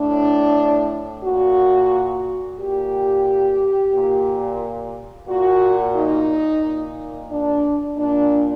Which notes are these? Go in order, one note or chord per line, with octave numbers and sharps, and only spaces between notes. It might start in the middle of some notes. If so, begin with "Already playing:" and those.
Already playing: A2 D4
A#2 F#4
A#2 G4
A#2
A#2 F#4
D#4
A#2
D4
A#2 D4